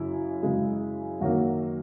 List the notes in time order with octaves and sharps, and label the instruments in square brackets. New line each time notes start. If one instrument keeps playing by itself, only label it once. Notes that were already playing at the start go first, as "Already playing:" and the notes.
Already playing: [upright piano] F#2 C#3 E4
F#2 C#3 G#3
F#2 D#3 F#3 A#3 F#4